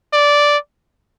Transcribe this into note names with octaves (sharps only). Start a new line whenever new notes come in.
D5